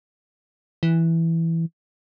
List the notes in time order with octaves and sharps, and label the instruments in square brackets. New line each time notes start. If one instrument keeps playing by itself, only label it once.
[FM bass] E3